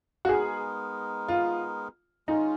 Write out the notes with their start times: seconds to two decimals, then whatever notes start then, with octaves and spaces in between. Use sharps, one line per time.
0.25 F#4
0.29 G#3 B3 D#4 G#4 A#4
1.28 F4
2.28 G#3 C#4 D#4 F4